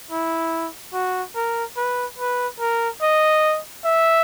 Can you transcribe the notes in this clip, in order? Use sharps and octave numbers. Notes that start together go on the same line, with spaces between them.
E4
F#4
A#4
B4
B4
A#4
D#5
E5